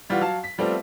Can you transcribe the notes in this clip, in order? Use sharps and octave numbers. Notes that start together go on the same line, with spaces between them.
E3 G3 F4 F#4
F#3 F5 A5
B6
F3 G3 A3 B3 C4 F4